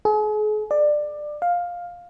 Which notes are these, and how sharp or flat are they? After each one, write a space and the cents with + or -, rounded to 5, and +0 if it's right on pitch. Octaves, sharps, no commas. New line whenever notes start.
G#4 +40
D5 +20
F5 +10